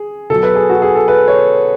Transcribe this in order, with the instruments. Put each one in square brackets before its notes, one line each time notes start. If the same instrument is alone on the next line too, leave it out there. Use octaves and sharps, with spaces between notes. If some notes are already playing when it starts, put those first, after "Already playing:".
Already playing: [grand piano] G#4
B2 F#3 A4
B4
G#4
F#4
G#4
A4
B4
C#5